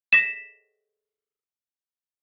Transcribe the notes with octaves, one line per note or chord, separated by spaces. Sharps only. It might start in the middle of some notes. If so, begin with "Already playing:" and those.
A#6 B6 E7